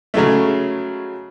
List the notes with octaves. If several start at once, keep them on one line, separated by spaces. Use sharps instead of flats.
C#3 F#3 G#3 A3